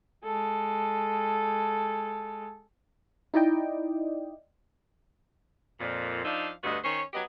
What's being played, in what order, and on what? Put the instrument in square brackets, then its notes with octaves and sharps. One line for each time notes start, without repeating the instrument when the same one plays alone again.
[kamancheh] G#3 A4
[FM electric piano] D#4 E4 D5 D#5 G5
[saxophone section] F2 A#2
F3 D4 D#4 E5 F5
D2 G2 B3 F#4 D#5
D#3 C#4 C5 C#5
F#3 B3 G4 D#5